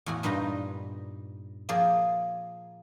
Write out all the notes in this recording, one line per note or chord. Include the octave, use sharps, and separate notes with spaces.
E2 A2 F#4 G#5
G2 A#2 G3 D#4 B4 A#5
F3 A#3 G#4 D5